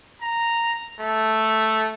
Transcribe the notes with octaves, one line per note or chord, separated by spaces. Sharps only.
A#5
A3